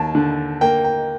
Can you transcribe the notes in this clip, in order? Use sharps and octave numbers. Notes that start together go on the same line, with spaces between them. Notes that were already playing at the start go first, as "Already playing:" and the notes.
Already playing: D#2 A5
D3
A#3 G5
G5